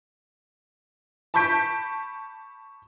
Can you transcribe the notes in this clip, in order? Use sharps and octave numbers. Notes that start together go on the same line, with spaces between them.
A5 B5 C#6 G6 B6 D7